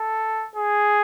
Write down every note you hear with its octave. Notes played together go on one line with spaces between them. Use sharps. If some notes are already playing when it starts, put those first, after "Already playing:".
Already playing: A4
G#4